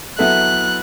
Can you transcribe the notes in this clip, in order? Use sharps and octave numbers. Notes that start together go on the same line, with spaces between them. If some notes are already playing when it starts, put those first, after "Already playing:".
F#3 B3 E4 A4 E5 F#6